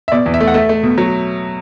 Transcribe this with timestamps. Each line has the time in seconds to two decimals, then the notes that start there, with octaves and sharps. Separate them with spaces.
0.08 E5
0.12 B2 D5
0.26 E2
0.34 E5
0.40 A3
0.47 F#5
0.54 A3 E5
0.69 A3
0.83 B2
0.98 F#3